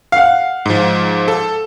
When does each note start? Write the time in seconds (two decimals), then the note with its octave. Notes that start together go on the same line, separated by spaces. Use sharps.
0.12 F5 F#5
0.66 G#2 F3
1.28 A4